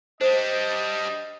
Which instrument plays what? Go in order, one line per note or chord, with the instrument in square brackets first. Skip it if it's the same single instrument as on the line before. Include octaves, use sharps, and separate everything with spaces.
[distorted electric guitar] G3 D4 [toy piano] C5 [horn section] D#5